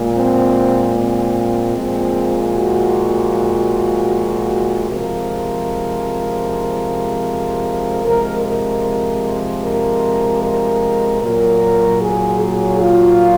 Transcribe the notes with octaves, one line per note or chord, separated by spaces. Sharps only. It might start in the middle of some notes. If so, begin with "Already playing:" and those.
Already playing: A#2 G#3
C4
C4
A#2 F3 G#3
F#4
C3 F3 G#3 A#4
C3 F3 G#3 A#4
A#4
A#4
A#4
A#2 F#3 A#4
G#4
G#4
F4